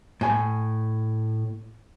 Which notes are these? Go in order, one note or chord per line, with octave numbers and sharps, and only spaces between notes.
A2 G#5